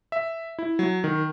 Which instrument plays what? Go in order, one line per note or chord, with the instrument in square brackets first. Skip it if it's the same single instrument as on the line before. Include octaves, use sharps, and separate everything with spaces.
[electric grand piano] E5
E4
F#3
D#3